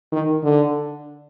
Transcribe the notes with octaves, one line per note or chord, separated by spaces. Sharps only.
D#3
D3